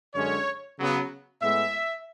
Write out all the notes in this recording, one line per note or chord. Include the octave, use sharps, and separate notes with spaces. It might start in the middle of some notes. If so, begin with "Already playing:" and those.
F#2 D3 G#3 C#4 C#5
C#3 F#3 B3
A2 G#3 B3 E5